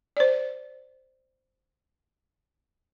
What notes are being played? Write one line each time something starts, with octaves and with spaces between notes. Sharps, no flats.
C5 D5